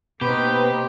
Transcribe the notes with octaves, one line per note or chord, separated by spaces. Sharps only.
B2 A#3 C4 D#4 G4 B4